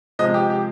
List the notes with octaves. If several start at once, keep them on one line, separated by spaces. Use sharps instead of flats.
C3 F3 G#3 D#5
G4
G4